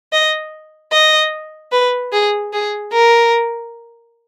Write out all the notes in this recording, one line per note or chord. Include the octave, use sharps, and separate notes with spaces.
D#5
D#5
B4
G#4
G#4
A#4